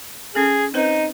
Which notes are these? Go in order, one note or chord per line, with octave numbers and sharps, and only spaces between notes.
C#4 G#4 A4
C4 D#4 B4 C5